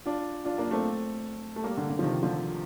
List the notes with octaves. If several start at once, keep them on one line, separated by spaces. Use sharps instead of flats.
D4 F4
D4 F4
A#3 D4
A3 C4
A3
G3 A#3
D3
D3
F3
C3 D#3
D3 F3